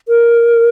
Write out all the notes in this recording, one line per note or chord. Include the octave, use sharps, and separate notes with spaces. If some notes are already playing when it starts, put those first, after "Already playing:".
A#4